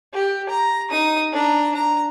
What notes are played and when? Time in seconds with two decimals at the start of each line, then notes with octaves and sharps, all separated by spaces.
0.13 G4
0.49 A#5
0.90 D#4 D#6
1.32 D4 A#5
1.75 A#5